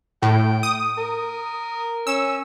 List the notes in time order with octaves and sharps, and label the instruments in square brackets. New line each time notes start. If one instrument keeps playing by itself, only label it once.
[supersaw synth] A2 [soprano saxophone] G5
[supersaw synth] D#6
[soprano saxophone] A#4
[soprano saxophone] C#4 [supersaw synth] E6